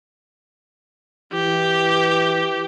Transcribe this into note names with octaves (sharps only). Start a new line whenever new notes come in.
E3 G4